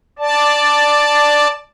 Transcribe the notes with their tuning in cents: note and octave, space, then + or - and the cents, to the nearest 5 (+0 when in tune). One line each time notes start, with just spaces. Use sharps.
D5 +0 A5 +0